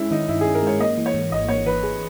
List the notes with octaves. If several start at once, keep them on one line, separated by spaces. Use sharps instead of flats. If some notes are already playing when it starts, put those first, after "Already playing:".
Already playing: G#3 C#4 E4
D#3 D#4
G2 E4
G#4
C#4
A#4
G#3 C#5
A#3 D#5
E3
C#5
G#2
G#1 D#5
A#3 C#5
E3 B4
G#4